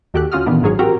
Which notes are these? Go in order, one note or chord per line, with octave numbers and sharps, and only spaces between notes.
D#2 F#4 G4 A4 F#6
D2 C#4 F4 F#4 D#6 F6
A#2 D#3 E3 B3 D4
G#1 G#2 F#3 G#4 C#5
C4 F#4 G4 A#4 G5 A#5